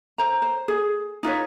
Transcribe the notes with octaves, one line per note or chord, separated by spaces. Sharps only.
C5 A#5
C5
G#4
D#4 F4 B4 C#5